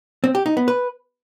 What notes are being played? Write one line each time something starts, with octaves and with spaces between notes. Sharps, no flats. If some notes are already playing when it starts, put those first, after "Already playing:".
C4
G4
D#4
B3
B4